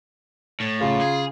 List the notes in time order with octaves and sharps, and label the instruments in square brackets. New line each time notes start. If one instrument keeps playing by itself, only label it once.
[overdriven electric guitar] A2
[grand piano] C#3 [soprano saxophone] F4
[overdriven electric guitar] G#4